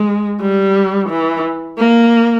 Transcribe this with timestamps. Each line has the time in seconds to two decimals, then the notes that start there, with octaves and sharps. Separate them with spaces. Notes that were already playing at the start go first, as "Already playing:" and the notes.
Already playing: G#3
0.41 G3
1.09 E3
1.78 A#3